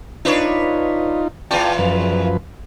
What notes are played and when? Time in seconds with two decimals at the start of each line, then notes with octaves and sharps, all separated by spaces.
0.25 D4 D#4 F4 B4 C#5
1.51 E2 E3 F4 D5 G5 A5
1.79 F#2 F3 B4